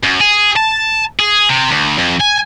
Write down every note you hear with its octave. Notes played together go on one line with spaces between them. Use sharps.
F#2
G#4
A5
G#4
C3
D2
F2
G#5